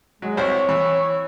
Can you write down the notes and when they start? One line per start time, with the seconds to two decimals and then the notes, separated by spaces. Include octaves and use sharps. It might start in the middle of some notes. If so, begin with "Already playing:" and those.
0.22 F#3 G#3
0.37 C2 C3 C5 C#5
0.69 E3